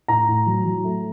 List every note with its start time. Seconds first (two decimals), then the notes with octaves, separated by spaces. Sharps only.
0.08 A2 A#5
0.28 A2
0.46 F#3
0.65 F#3
0.84 A3